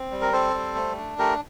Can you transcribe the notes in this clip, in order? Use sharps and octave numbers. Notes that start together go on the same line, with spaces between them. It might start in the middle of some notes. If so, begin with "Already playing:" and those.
Already playing: C4
G3
A#4
C4 A4 C5
G3
A3
D4
A3 G4 A#4